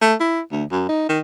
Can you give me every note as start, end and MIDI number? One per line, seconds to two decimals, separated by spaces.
0.01 0.14 57
0.20 0.40 64
0.52 0.64 38
0.71 0.84 42
0.89 1.07 63
1.09 1.19 51